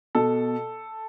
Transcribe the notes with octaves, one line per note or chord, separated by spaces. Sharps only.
B2 A4